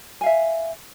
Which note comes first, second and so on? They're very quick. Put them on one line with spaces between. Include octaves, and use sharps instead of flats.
G#5 F5 E5